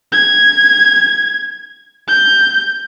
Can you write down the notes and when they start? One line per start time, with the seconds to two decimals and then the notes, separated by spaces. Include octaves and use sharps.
0.12 G#6
2.08 G6